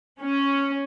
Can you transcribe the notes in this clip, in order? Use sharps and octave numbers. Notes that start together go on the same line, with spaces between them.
C#4